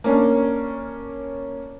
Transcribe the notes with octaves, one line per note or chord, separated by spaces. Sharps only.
A#3 C#4 D4